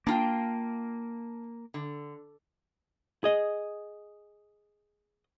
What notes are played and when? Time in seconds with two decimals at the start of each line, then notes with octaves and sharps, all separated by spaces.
0.07 A#3 D4 F4 G5
1.74 D3
3.24 G#4 D#5